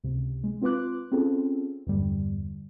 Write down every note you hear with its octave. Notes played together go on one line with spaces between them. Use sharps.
C#2 C3
G#3
C4 F4 B4 C6 D6 F#6
C4 C#4 F4 G#4 A4
E2 G2 D3 G3